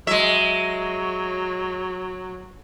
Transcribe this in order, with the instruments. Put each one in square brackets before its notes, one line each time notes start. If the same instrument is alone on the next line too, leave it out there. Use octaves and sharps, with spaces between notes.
[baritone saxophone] F#3 [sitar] G#3 E5